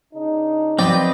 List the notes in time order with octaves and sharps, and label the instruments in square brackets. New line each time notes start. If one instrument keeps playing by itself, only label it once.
[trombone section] C#3 D4 D#4
[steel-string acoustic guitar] F3 F#3 [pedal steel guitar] C4 B4 D#5 [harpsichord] D5 G5